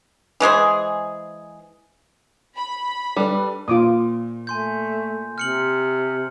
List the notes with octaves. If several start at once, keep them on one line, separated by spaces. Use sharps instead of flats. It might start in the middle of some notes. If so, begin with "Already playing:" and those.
E3 G#3 G#4 C5
B5
G3 D4 A4 B4
A#2 F4 D6 D#6
A3 G#5 C6 G6
C3 F6 C#7 F#7